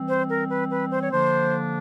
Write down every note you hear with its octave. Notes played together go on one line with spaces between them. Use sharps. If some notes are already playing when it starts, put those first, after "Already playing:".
Already playing: E3 G3 C4
C5
A#4
B4
B4
C5
C#5
D3 F3 A#3 D4 C5